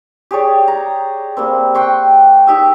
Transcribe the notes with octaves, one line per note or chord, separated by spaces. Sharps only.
G4 G#4 C#5 D5
A#5
G3 A#3 C4
F#5 G5 C6 C#6
D#4 G4 E5